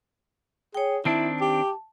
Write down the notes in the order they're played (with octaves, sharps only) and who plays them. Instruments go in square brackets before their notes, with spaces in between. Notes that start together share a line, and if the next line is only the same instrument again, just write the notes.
[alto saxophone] G#4 [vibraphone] C#5 G5
[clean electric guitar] D#3 C4 D4 [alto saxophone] E4 [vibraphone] A5
[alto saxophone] G4